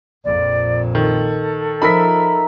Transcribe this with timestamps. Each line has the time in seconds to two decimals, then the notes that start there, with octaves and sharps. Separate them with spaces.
0.25 A#1 F2 A#2 D5
0.95 D#3 A4
1.82 F3 D#4 A#4 E5 B5 B6